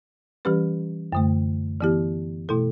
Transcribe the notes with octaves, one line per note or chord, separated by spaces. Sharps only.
E3 G3 C#4 G4 B4
F#2 D3 A3
E3 B3 E4 G4
B2 A3 E4 A4